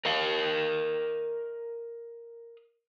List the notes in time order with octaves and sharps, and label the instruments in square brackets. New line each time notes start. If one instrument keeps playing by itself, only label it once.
[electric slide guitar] A#4 D#5 F5